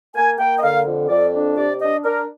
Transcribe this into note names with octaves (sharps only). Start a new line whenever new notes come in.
A#3 G#5
A#3 G5
D#5
D3 F5
F2
F2 D5
D4
C3 D5
D4 D#5
D4 A#4